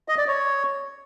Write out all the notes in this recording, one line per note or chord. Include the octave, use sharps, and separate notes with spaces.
D#5
D5
C#5